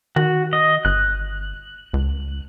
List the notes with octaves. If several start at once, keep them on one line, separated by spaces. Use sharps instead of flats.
D#3 F#4
D#5
G1 F#6
C#2